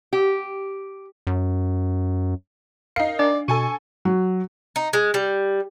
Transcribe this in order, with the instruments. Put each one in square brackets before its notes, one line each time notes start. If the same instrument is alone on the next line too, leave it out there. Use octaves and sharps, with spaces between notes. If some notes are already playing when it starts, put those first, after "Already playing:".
[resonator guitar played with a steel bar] G4
[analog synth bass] F#2
[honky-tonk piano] D#4 C7 [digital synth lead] A#4 [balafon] F5
[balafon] D4 [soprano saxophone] D5
[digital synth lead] B2 [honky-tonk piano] A4 G#5 D#7 [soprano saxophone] C#6
[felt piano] F#3
[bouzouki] D#4
G#3
G3